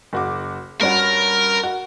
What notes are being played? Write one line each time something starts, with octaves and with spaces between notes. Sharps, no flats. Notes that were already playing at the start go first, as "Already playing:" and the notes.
F#1 F#4 D6
G2 C#4 F#4 A#4
F#4